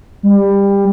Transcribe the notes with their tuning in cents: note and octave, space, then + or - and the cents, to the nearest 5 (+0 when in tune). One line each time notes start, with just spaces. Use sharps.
G3 +20